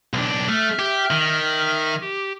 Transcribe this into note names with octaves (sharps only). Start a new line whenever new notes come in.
B1 D4
A3 E5 F6
G4
D#3
G4